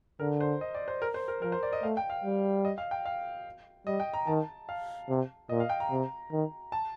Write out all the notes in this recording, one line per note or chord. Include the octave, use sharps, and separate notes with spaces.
D3 A#4
C5
D#5
D5
C5
A#4
C5
A#4
F3 A#4
C5
D5
D#5
A3 F5
G5
F5
G3
D#5
F5
G5
F5
G3 D#5
G5
A#5
D#3 A5
F5
C3
A#2 D#5
F5
G5
A#5
C3
D#3
A5